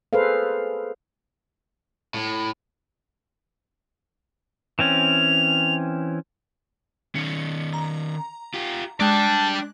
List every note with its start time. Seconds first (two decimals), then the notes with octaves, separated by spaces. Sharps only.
0.13 G#4 A4 B4 C5 F5
2.14 A2
4.79 E3 C4 C#4 F7
7.15 D#3 C#4 C#7
7.73 A#5
8.54 F4 G4
9.00 G#3 D4 D5 G5 A5 F#6